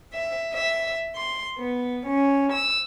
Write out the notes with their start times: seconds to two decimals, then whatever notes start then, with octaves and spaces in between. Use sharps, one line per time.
0.11 E5
0.52 E5
1.15 C6
1.58 B3
2.04 C#4
2.51 E6